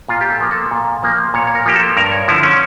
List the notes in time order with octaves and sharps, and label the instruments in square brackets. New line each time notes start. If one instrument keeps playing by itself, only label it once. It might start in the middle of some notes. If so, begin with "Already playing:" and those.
[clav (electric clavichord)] A#2 F4
G4
A4
F3 A#3
A4
A#2
F3 A#3
A#2 C#5
C#5
A#4
F3 A#3 G4
A4
G2 A#4
C#5
D3 F3 E4
C#4